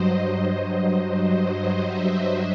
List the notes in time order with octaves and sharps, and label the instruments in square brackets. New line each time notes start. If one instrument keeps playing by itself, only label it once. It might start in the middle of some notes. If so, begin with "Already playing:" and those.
Already playing: [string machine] G2 F#3 C5 D#5
C5
D#5
E5